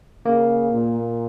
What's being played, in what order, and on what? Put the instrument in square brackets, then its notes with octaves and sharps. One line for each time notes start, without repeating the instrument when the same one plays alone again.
[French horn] C#3 [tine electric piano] A#3
[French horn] A#2